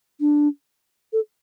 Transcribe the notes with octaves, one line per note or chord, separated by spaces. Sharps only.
D4
A4